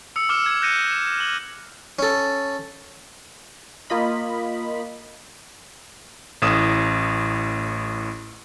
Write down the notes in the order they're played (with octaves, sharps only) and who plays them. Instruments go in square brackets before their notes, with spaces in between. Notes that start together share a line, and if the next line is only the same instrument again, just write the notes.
[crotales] D#6 E6 C#7
D6 E6 F6 C#7 E7
G#6 E7
F#6 G6 A#6 C#7 D#7 E7
E7
F6 F#7
[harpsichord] C#4 A4
[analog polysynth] A#3 F4 D#5 B5
[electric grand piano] A1 A2 D#6 E7